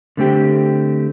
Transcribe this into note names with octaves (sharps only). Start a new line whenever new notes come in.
D3 A3 C4 G4